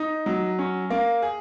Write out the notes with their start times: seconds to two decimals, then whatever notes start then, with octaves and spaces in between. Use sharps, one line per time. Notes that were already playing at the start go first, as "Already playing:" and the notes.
Already playing: D#4
0.26 F#3
0.59 C#4
0.90 A#3
1.22 G#4